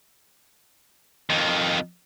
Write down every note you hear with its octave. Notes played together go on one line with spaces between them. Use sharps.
F2 D#3